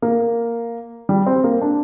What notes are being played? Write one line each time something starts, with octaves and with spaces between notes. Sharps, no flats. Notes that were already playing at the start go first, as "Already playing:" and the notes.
A#3
G3
C4
A#3
D4